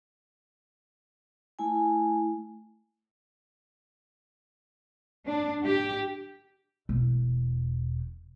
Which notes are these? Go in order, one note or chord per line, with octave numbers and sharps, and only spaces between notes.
A3 E4 G#5
D4
G4
E1 A3